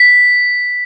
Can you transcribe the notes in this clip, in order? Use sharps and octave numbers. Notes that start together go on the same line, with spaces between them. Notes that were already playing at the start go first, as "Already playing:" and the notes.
Already playing: B6